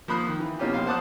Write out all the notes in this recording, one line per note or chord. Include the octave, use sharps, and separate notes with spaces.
F3 A#3 B5 D#6 F#6
D#3
E3
B2 A#3 C#4 D#4 F4 G4
A#1 F5 C6
C5 F#5 A5 D6 D#6 F#6